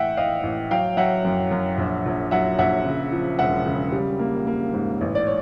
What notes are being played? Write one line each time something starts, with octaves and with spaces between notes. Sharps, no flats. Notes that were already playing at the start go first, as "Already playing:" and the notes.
Already playing: A2 E3 E5 F#5 G5
A2 D#5 F5
A1
F#3 F5 G5
F#3 E5 F#5
F#2
F#2
A#1
A#1
F#3 E5 F#5
A#1 E5 F#5
C#3
F3
E1 E5 F#5
C#3
G3
A#3
A#3
G#2
A1
D5
C#5